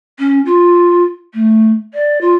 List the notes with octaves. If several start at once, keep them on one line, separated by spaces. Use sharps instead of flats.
C#4
F4
A3
D5
F4